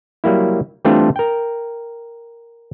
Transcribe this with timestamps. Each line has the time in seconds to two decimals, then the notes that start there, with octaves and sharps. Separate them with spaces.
0.24 F#3 G3 A#3 E4
0.85 E3 G3 A3 C4 D4 F4
1.16 A#4 G5